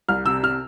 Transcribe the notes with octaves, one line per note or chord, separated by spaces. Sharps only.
C2 F6
C3 E6
C3 F6